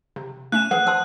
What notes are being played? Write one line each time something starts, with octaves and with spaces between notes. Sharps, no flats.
C3
A3 C#4 F#6 E7
E3 F3 G#4 B4 F#5
C5 A5 C6 D#6